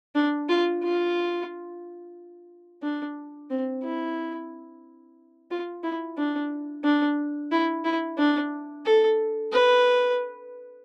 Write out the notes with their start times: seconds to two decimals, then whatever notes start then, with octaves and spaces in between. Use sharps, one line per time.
0.15 D4
0.49 F4
0.83 F4
2.83 D4
3.50 C4
3.83 E4
5.51 F4
5.84 E4
6.18 D4
6.84 D4
7.51 E4
7.84 E4
8.18 D4
8.86 A4
9.52 B4